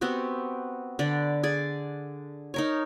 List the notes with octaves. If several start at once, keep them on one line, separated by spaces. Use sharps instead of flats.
B3 C4 F#4 G4
D3 D5 B5
G#4 D5
D#4 A#4 C#5